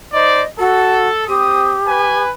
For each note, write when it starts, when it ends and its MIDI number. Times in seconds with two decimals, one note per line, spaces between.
0.13 0.43 63
0.13 0.43 72
0.13 0.43 74
0.13 0.47 75
0.59 1.08 66
0.59 1.27 69
1.28 1.76 60
1.28 2.23 67
1.28 1.76 87
1.87 2.31 71
1.87 2.31 80